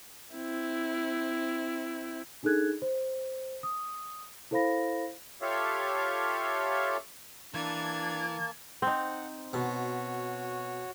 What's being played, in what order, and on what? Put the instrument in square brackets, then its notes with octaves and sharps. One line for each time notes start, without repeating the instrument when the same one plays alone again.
[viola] C4 E4
[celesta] D4 D#4 G#4 A4 F#6 G#6
C5
D#6
E4 A4 C5 F5 B5 A#6
[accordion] F4 G4 A4 C#5 E5 F5
[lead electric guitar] E3 [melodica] A#3 A5 [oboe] D4 [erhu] G#6
[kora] C4 D#4 [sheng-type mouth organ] F#5
[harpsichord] B2 [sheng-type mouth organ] F#4 C#5